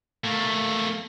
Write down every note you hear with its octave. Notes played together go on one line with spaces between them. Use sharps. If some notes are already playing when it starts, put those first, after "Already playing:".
A3 A#3